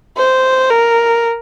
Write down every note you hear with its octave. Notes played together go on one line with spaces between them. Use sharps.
C5
A#4